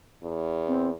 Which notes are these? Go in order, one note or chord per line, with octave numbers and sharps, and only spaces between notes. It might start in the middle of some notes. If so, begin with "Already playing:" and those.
E2
C4